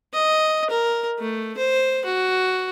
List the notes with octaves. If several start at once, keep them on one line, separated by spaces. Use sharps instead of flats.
D#5
A#4
A3
C5
F#4